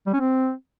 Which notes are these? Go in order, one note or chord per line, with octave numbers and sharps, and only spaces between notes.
G3
C#4
C4